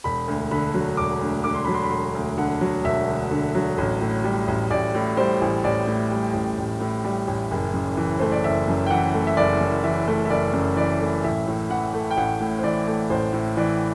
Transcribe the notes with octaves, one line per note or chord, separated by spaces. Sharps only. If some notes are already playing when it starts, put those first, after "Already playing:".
E1 B5
D2
D3 B5
F#3
E1 D6
D2
D3 D6
C6
F#3 B5
C6
B5
E1 C6
D2
D3 F#5
F#3
E1 E5
D2
D3
F#3
A1
A2
G3
A1
A1 D5
A2
G3 C5
A1
A1 D5
A2
G3
A1
A1
A2
G3
A1
F#1
F#2
E3
A3 C5
D5
F#1 E5
F#2
G5
E3 F#5
A3
E5
F#1 D5
F#2
E3 E5
A3
E5
F#1 D5
F#2
E3 D5
A3
A1 E5
A2
E3 F#5
A3
G5
A1 F#5
A2
C5
E3 D5
A3
A1 C5
A2
E3 D5